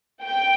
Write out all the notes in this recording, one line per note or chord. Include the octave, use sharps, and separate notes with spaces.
G5